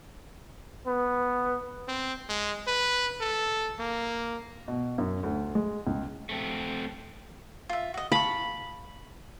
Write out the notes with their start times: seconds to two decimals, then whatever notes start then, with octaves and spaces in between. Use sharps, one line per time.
0.87 B3
1.88 C4
2.29 G#3
2.67 B4
3.21 A4
3.79 A#3
4.68 B2
4.98 F#2
5.23 D2
5.55 G#3
5.87 C#2
6.29 A3 C4
7.69 F4 E5
7.94 F#4 D#5
8.12 F5 A5 B5 C#6